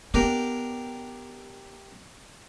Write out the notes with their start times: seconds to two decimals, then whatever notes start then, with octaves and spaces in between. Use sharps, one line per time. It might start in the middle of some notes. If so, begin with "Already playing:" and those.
0.14 B3 D4 G4 A#4